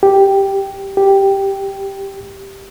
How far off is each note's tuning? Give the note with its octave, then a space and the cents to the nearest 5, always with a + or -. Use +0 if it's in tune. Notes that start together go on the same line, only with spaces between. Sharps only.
G4 +0
G4 +0